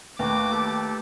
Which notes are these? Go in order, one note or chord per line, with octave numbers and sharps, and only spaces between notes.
D#2 A3 A#3 F#4 B4 D6
G4 A4